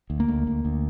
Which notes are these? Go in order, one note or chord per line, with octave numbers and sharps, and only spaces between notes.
D2
A#3
D2
D2
D2